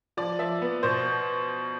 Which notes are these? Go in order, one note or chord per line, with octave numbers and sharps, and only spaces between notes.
F3 D5
F3 E5
B3
B2 C5